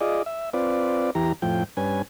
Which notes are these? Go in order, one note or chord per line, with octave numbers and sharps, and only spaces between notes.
F4 G#4 D5 D#5
E5
C4 F4 B4 D5
E2 E3 G4 A#5
F2 A2 F3 G5
G2 C#4 B4 G#5